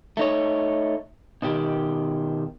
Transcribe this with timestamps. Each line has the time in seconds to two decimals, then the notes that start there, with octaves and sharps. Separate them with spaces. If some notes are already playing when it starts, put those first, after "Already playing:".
0.17 A3 D#4 C#5
1.42 B2 D#3 G4